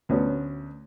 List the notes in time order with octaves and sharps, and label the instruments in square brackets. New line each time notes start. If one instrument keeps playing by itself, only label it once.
[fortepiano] D2 B3 C#4 F#4